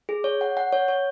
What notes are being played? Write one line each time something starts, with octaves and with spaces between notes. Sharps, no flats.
G#4
C#5
F#5
F#5
C#5
C#5